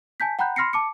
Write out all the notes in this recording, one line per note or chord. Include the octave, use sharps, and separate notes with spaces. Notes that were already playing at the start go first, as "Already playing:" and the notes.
G#5 A5 G6 B6
F#5 G5 A#5 B5 F#6 G6
B5 C6 F6 A#6 C7 C#7
A5 D6 C#7